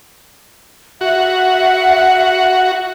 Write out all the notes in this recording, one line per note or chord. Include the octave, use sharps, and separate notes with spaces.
F#4 E5 F#5